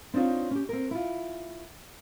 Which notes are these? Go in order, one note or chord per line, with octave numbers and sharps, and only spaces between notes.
C4 D4 D#4 F4 C#5
C#4 G4
C4 A#4
E4 F4